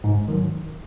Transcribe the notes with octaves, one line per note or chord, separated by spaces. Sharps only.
G#2
D#3 F#3